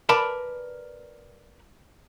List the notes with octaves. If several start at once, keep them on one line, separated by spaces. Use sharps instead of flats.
A#4 B4 D5 A5 B5